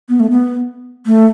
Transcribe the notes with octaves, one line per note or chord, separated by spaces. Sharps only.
B3
A3
B3
A3